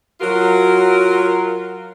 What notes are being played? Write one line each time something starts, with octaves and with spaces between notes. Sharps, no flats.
F#3 F4 F#4 A#4